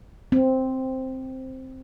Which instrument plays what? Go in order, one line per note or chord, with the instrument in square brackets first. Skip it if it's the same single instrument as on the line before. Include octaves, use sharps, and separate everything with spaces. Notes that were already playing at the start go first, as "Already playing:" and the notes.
[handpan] C4